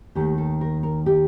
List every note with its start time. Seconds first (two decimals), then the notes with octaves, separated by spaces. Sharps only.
0.15 D#2 D#3 A3 G4
0.38 A4
0.61 A#4
0.83 A#4
1.06 G4